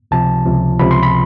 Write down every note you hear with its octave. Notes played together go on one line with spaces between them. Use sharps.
C#2 C3 F3 A5
C#2 C3 F3
C#2 C3 F3 B5
C6
B5